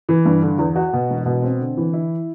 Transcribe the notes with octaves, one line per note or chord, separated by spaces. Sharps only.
E3
G2
D3
E2
F#4
B2
E1
B2
C4
D3
E3
E4